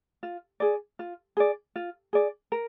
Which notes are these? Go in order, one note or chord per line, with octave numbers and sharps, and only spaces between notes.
F4
G#4 D5
F4
G#4 D5
F4
G#4 D5
A#4